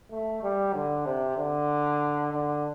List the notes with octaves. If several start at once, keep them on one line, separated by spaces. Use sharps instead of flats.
A3
G3
D3
C3
D3
D3